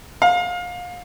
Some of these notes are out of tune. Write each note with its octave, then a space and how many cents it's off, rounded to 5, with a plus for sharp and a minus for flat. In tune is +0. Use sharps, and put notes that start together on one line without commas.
F5 +30